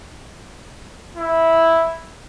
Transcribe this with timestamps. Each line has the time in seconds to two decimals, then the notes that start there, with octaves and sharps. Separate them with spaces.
1.16 E4